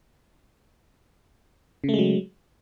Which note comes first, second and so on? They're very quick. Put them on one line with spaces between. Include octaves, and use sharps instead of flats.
C#3 A3 G#3 F#3